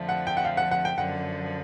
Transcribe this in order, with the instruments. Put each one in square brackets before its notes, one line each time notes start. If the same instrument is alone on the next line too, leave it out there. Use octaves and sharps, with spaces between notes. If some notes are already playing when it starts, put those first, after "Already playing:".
Already playing: [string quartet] F2 D3 F3 A3
[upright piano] F#5
G5
F#5
F5
F#5
F#5
G5
[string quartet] F#2 D3 F3 [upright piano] F#5